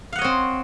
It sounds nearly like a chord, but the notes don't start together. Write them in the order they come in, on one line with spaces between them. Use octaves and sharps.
F5 F#5 D#5 C#5 C4